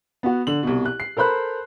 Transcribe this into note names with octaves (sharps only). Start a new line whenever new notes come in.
B3 F#4
D3 F#7
C2 B2
F#6
C7
A4 A#4 C5 B5 F#6